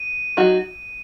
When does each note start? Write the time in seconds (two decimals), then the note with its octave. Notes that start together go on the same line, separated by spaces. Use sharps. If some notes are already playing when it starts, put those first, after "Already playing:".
Already playing: D#7
0.37 F#3 D#4 F#4